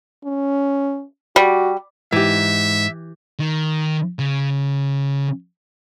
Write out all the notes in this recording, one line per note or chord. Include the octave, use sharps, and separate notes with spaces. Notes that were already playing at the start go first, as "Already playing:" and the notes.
C#4
G3 F#4
G#2 E3 G4 E5
D#3
C#3